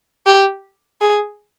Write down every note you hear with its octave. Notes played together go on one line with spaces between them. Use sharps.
G4
G#4